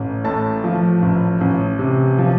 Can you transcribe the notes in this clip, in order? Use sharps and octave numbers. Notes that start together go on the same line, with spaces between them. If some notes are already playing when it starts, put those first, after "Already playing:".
Already playing: A1
A2 A5
F3
A1
A1
C3
F3